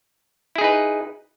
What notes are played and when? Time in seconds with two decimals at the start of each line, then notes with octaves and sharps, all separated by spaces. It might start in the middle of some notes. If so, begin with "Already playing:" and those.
0.56 E4
0.58 G#4
0.61 D#4
0.64 B4